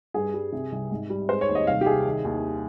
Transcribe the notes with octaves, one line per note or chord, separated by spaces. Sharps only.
G2 G#4
G3
C3
C2
G#2
G3
G#3 C5
C#5
D#2
D#5
C2 F5
G4
C2 G#4
D#3
D#2